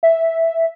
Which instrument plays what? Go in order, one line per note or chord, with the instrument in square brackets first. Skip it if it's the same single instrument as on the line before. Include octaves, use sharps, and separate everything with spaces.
[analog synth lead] E5